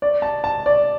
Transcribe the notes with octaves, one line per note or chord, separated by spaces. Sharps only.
D5
A5
A5
D5